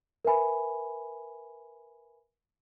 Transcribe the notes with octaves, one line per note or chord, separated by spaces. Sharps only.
A#4 B4 E5 G#5 B5